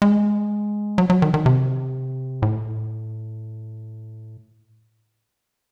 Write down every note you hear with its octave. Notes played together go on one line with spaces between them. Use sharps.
G#3
F#3
F#3
D#3
D#3
C3
A2